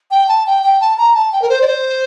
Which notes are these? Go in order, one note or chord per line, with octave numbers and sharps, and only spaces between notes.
G5
A5
G5
G5
A5
A#5
A5
G5
A#4
C5
D5
C5